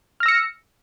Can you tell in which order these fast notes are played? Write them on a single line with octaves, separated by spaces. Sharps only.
F6 A#6 E6 C#7